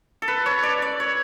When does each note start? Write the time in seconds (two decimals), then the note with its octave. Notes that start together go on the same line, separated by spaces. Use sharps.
0.22 A4
0.28 B4
0.46 C#5
0.63 D5
0.82 D5
1.00 C#5